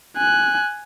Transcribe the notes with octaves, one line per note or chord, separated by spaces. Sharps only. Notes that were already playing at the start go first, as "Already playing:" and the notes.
G#5 F#6